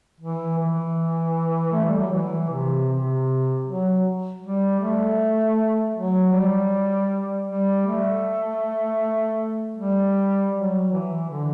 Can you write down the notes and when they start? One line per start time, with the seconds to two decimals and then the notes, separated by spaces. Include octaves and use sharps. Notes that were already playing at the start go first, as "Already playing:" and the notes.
0.20 E3
0.58 E3
1.72 A3
1.85 G3
1.99 F#3
2.12 E3
2.50 C3
2.88 C3
3.65 F#3
4.41 G3
4.80 A3
5.94 F#3
6.33 G3
7.48 G3
7.86 A3
9.77 G3
10.54 F#3
10.92 E3
11.30 D3